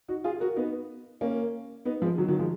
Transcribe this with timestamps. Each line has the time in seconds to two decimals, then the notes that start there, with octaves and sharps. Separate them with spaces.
0.08 D#4 F#4
0.24 F4 G#4
0.40 F#4 A#4
0.56 B3 D#4
1.21 A#3 C#4
1.85 B3 D#4
2.02 F3 G#3
2.18 D#3 F#3
2.28 D#3 F#3
2.39 F3 G#3